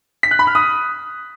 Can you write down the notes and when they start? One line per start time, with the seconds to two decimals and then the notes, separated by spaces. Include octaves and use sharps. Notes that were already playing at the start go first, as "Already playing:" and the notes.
0.23 B6
0.31 F#6
0.39 B5
0.47 F6
0.55 D#6